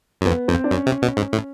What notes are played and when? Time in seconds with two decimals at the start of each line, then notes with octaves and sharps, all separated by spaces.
0.21 F#2
0.26 F2 B3
0.48 F2 C4
0.64 D4
0.71 F#2 C#4
0.87 C3
1.02 B2
1.17 G#2
1.33 A2